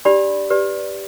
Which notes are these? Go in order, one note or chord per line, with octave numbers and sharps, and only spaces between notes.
D4 G4 D5 B5
G4 B4 D5